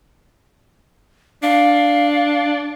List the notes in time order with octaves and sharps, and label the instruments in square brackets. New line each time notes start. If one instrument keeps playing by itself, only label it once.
[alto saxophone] D4 [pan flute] F5